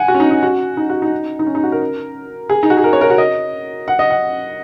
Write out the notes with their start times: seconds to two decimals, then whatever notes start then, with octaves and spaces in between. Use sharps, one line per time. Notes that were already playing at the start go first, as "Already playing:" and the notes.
Already playing: F#5 G#5
0.08 F#4
0.14 C#4
0.20 D#4
0.31 D#4
0.43 F#4
0.77 D#4
0.90 F#4
1.02 D#4
1.39 D#4
1.47 C#4
1.55 D#4
1.63 F#4
1.72 A#4
2.49 G#4
2.63 D#4
2.70 F#4
2.77 G#4
2.84 A#4
2.93 C#5
3.01 A#4
3.10 F#4
3.18 D#5
3.88 F#5
3.99 D#5
4.10 F#5